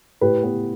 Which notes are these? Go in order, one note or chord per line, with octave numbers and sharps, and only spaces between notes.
A2 G4 B4
B3